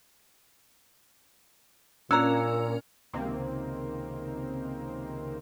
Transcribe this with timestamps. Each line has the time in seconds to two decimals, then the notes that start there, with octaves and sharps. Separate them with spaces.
2.11 A#2 C#4 D4 A#4 A#5 E6
3.13 C#2 C3 D#3 A#3 C4